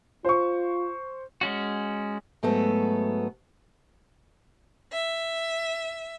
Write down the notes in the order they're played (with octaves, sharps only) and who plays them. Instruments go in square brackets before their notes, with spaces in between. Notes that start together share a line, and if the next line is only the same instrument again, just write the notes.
[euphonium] F4 [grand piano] C5 C#6
[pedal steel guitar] G#3 C#4 F#4
[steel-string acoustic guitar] G#2 F#3 A3 B3 A4
[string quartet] E5